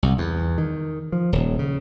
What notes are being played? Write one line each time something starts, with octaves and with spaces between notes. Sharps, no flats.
C2
E2
D#3
F3
D#1
C#3